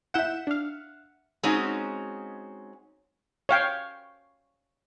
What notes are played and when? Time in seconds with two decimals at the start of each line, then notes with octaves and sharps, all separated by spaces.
0.14 E4 E5 F#5 G6 E7
0.47 D4 F5
1.43 G#3 C4 C#4 D#4 F#4
3.49 C#5 F5 G5